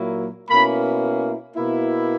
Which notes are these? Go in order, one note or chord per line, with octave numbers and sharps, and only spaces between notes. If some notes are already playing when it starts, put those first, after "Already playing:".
Already playing: A#2 F#3 A#3 E4
B2 A#3 C#4 E4 B5
B2 A#3 E4